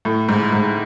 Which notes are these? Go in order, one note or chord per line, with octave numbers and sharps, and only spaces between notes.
A2
G#2
G#2